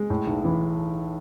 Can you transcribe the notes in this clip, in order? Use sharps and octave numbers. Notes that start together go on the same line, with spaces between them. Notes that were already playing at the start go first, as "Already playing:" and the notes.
Already playing: G#3
A2
B1
E3